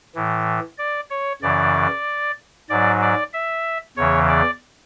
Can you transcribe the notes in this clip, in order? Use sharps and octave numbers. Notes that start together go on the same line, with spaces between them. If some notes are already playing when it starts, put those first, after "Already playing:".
A2 E3
D5
C#5
F#2 C#3 E3 D5
G#2 F#3 D5
D5
E5
E2 C#3 E3 C#5
D5